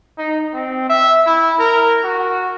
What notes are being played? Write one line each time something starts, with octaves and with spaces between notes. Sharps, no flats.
D#4
C4
E5
E4
A#4
F#4